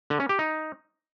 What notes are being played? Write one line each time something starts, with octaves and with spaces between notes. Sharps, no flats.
D3
C#4
G4
D#4